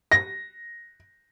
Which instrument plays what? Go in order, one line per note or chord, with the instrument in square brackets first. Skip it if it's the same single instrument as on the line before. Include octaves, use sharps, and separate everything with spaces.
[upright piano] A#6